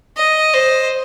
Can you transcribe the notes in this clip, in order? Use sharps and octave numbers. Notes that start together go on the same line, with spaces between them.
D#5
C5